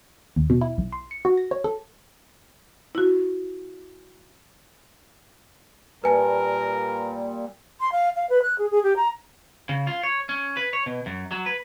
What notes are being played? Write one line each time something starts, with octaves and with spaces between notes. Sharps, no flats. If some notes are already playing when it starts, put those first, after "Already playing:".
D#2
B2
E4
B1
C6
C#7
F#4
A#6
C#5
A4
E4 F#4
A#2 G3 A#4 B4 G#5 A5
C6
F5
F5
B4
F#6
G#4
G#4
G4
A#5
C#3
F4
C#5
C#4
B4
C#5
B2
F#2
F#3
B4